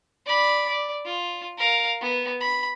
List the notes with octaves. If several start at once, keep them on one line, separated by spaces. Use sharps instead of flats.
D5 B5
D5
F4
A#4 F5
B3
B5